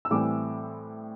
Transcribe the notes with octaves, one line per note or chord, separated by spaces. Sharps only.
E6
A2 E3 G3 C4 D6